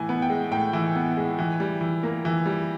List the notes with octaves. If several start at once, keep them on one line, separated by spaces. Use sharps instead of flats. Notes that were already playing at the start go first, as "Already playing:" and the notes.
Already playing: A2 E3 G#5
B3
G5
G#3
A2 G5
E3
B3
G#3
E3
G3
E3
A#3
E3
G3